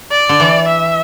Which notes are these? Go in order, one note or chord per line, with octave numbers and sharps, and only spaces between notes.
D5
D3
E3
E5